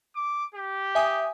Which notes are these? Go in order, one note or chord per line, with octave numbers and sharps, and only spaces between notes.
D6
G4
E5 G#5 D#6